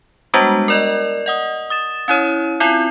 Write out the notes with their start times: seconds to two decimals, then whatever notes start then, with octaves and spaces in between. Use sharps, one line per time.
0.34 G3 G#3 B3 D4 F#4
0.68 A#4 D5 D#5
1.26 D#5 F#5 D#6
1.70 D#6 A6 E7
2.08 C#4 E4 C#5
2.60 C4 E4 F4